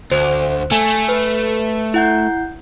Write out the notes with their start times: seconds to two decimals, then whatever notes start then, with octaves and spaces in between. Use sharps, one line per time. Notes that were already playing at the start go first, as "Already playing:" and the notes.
0.12 D2 C5
0.72 A3 G#5
1.09 B4
1.94 E4 F#5 G6